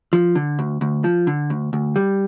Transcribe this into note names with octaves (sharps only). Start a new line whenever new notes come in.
F3
D3
D2
D2
F3
D3
D2
D2
G3